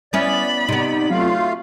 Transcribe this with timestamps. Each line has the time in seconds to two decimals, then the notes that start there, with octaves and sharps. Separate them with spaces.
0.13 B3 C#4 E4 D5 B5
0.68 C3 B3 D#4 D5
1.11 F#3 A3 F4 F5